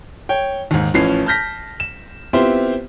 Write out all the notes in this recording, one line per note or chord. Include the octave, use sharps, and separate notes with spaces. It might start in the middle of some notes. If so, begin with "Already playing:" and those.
C#5 G5
D#2 G#2
A1 E3 F3 C#4 C7
A5 F6 G6 A#6 B6
E7
B3 C4 E4 F4 G4 C5